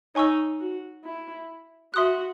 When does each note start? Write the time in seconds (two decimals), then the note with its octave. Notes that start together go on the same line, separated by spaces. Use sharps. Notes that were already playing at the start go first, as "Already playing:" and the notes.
0.15 D#4 C#5 G#5 C#6 E6
0.60 F#4
1.05 E4
1.94 F#4 E5 C6 D#6 F#6